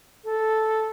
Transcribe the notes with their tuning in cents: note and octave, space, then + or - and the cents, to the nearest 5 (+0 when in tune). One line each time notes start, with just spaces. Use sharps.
A4 -5